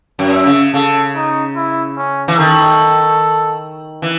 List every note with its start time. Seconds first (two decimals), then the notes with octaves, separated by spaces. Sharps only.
0.19 F#2
0.33 E5
0.46 C#3
0.74 C#3 A4
1.16 D#4
1.57 E4
1.97 C#4
2.28 E3
2.39 D#3 A4
4.02 E3